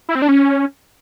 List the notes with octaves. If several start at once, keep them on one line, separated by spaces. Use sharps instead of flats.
E4
C4
D4
C#4